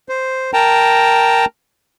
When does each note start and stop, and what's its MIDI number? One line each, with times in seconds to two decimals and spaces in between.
0.09 0.51 72
0.54 1.45 70
0.54 1.45 79
0.54 1.45 81
0.54 1.45 82